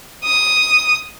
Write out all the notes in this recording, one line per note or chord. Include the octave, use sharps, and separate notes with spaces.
D#6